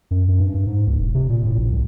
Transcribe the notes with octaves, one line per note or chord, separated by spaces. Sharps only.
F#2
F#2
G2
G2
G#2
C#2
E1
C3
A#2
A2
A#1
C2